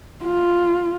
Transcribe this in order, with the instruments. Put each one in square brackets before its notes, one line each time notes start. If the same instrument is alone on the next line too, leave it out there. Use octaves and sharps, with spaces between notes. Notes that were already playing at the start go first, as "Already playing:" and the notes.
[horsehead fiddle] F4